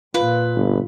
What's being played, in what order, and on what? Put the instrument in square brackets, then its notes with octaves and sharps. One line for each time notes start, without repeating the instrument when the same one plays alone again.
[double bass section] A#2 [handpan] F4 [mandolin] B4
[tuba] G1